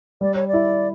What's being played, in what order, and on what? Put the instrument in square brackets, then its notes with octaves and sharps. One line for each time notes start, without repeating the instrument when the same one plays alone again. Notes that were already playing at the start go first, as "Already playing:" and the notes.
[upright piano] G3 [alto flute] D5
[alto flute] C#5
D5
[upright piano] E4